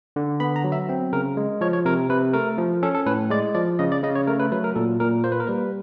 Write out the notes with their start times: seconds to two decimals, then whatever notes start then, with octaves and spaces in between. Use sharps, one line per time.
0.16 D3
0.40 B3 B5
0.56 A#5
0.64 F#3
0.72 E5
0.89 C4
1.13 C#3 A#4
1.37 G#3
1.61 F3 C#5
1.73 C#5
1.85 C3 A#4
2.10 C3 B4
2.33 A3 A#4
2.58 F3
2.83 C#4 A4
2.95 A4
3.06 A2 B4
3.30 G#3 D5
3.55 F3 D5
3.79 C#3 D#5
3.92 D5
4.03 C#3 D#5
4.15 C#5
4.27 A3 A#4
4.40 B4
4.52 F#3 B4
4.64 A#4
4.76 A#2 A4
5.00 A#2 A#4
5.24 A#3 C5
5.32 B4
5.40 A#4
5.47 G3 B4